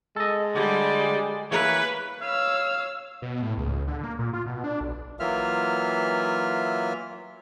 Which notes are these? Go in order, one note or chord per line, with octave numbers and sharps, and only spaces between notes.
G#3 A4 D#5
D3 G3 D5
E3 A#3 B4 C#5
C#5 F5 E6
B2
A2
C#2
C#2
D3
A#3
A#2
F4
B2
D4
B1
E3 F#3 A#3 F4 E5 F6